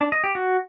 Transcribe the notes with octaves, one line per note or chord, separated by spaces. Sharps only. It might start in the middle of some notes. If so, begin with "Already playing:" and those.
D4
D#5
G4
F#4